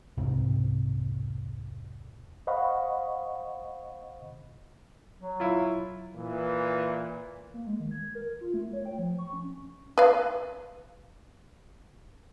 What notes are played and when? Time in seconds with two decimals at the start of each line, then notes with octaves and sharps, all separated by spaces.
0.18 E1 C2 G#2 C3
2.47 C5 D#5 F5 F#5 B5 C#6
5.20 F#3
5.40 E4 F4
6.15 A#2 E3
7.54 A#3
7.66 G#3
7.79 D#3
7.91 G#6
8.15 A#4
8.41 F4
8.54 A3
8.73 C#5
8.85 G5
8.98 F3
9.18 C#6
9.33 C#4
9.98 B4 F5